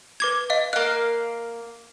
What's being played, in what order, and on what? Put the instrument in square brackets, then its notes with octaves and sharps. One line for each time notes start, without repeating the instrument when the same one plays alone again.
[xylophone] B4 D6 G#6
D#5 F5
[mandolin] A#3 F5 [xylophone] F#6